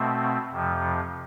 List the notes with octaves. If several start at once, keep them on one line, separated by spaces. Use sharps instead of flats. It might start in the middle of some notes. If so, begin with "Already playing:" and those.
Already playing: B2 A3 C4
F2 C3 F3